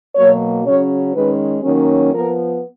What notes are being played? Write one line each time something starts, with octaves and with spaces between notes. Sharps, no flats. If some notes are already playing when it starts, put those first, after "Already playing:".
B2 F#3 A#3 C#5
C#3 F#3 C#4 C#5
D#3 G#3 C#4 B4
D#3 F#3 A#3 C#4
F3 B3 A#4